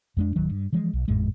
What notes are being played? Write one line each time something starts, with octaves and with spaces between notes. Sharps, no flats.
F2 G#3 D4
D1 D#3 F#3
G2
E3 F3 G#3
B1
G#1 F2 A2 G#3